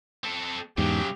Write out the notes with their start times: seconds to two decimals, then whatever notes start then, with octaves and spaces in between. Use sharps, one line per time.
0.24 C4 A4
0.78 E2 G#2 C#3 F#3 G4